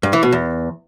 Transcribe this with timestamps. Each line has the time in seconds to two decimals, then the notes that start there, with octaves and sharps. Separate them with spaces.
0.03 G2
0.13 E3
0.23 B2
0.32 E2